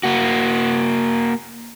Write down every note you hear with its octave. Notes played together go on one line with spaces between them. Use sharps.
A#3 F#4